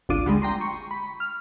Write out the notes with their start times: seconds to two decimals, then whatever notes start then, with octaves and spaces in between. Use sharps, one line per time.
0.09 G#1 D2 D4 F4 D6 D#7
0.26 D3 G3 G#3
0.42 G5 A#5 C6
0.61 C#6
0.91 B5
1.20 F6